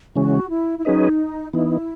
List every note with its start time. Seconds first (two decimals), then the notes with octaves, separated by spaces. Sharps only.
0.15 C#3 E3 G#3 C#4 F#4
0.49 E4
0.78 E4
0.85 F#3 C#4 D#4 G#4 B4 D#5
1.53 E3 B3 D#4 E4